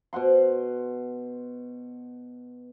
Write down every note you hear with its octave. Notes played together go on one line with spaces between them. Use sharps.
B2 C5 F#5 C6